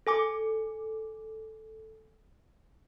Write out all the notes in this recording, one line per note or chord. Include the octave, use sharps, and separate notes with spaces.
A4 G#5 D6